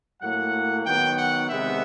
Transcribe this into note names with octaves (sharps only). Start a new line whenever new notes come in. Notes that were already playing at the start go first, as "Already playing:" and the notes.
A2 F#3 A#3 F#5
D#3 F#3 B3 G5
F#5
C3 D#3 G#3 B3 E5